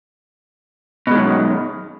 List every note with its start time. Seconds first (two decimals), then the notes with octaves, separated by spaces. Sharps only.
1.07 B2
1.11 G#3
1.15 D#3
1.18 F#2